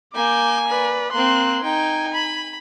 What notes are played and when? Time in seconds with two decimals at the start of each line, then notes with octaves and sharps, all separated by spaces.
0.15 A#3 G#5 D6 G6
0.68 B4 D5
1.13 A#3 C4 C6 F#6
1.63 D#4 G5 G#5
2.14 B5